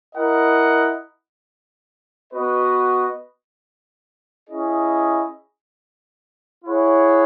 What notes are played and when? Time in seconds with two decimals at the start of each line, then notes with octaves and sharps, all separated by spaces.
0.15 E4 A#4 D#5 F#5
2.31 B3 F#4 B4 D#5
4.48 C#4 E4 G#4 D#5
6.65 E4 G#4 C#5 F#5